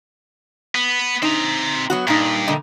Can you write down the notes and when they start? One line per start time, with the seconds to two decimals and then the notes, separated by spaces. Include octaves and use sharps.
0.75 B3
1.23 C4 D#4 A#5
1.90 F#3 B3 F#4
2.08 G2 A#2 D#4
2.48 A#2 D3 D#5